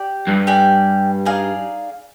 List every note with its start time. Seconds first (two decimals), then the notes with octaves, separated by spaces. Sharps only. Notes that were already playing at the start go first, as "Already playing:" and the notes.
Already playing: G4 D5
0.28 G2
0.47 G4 D5 G#5
1.25 D#4 G#4 D5 F5